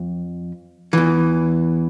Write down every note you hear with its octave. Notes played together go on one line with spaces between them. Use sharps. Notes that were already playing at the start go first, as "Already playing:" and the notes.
Already playing: F2
E2 E3